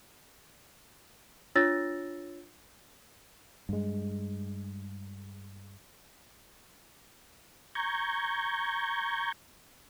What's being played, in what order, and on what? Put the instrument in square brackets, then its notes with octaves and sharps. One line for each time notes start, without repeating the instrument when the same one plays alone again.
[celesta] D4 F4 C#5 E6 A6 A#6
[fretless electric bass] G2 G#3
[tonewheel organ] A#5 C#6 G6 G#6